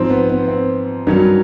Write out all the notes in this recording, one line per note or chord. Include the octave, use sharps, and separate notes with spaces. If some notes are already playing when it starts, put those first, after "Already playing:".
Already playing: G#2 F3 C4
B3
B3
C4
G2 D#3 F#3 C#4